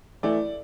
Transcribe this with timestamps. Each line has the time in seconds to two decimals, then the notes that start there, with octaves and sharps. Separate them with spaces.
0.23 E3 A3 D5